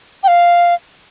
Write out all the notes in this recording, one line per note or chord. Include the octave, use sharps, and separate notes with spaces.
G5
F5